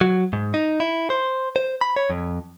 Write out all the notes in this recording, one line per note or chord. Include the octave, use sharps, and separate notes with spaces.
F#3
G#2
D#4
E4
C5
C5
B5
C#5
F2